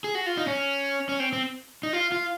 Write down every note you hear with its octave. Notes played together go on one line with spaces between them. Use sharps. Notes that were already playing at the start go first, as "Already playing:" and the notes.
G#4
F#4
F4
D#4
C#4
C#4
C4
C4
D#4
F4
F4